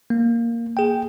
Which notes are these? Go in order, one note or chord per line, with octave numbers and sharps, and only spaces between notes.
A#3
G#4 G5